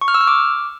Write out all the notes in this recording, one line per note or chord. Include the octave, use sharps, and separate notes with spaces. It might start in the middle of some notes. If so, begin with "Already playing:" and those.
C#6
F6
E6
F6
D6